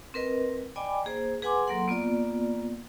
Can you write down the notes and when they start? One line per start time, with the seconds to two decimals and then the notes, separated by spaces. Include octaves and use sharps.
0.14 C4 A#4 B4 D#5
0.76 D5 D#5 G5 G#5 B5 D6
1.05 A#3 G#4 C5
1.42 G#4 B4 F#5 G#5 C6 D6
1.67 F#3 A#3 A4 F#5 C6
1.87 A#3 B3 F4 D5